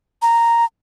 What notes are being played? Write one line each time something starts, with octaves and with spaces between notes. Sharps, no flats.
A#5